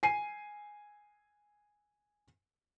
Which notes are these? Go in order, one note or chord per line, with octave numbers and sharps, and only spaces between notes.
G#5 C7 D#7